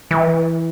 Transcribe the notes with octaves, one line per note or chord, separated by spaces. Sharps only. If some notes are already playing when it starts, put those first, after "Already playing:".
E3